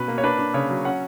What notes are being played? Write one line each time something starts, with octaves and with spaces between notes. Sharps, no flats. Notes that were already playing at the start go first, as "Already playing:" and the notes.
Already playing: B2 C#4 B4
A#3
C#5
D4 B4
D4
C#3 C#5
F#3
C#4 F#5